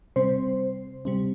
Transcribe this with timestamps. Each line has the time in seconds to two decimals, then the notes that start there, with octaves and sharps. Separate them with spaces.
0.16 C3 G3 C4 C5
1.05 C3 G3 C4